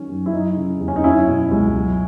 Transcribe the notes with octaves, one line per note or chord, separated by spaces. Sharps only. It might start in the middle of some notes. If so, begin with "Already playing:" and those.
Already playing: D#3 F#3 C#4
F#2
E4
F#3 D#4
C#3
E2
C#4
D#4
F#3 C#4 E4
B2
C#2
F#3